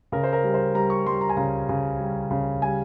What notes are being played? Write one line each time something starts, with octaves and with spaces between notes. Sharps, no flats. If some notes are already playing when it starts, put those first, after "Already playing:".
C#3 A#4
C5
A#4
G3
C5
G3 A#5
C#6
G3 C6
A#5
G#5
C#3 A#5
C#3
G3
C#3
G3 G#5